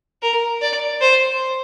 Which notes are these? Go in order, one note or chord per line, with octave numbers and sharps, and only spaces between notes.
A#4
D5
C5